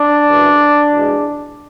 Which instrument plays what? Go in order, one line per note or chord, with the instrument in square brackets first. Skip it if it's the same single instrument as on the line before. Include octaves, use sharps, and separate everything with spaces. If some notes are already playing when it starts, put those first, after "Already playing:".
Already playing: [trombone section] D4
F#2 C#3 E3
E2 B2 G#3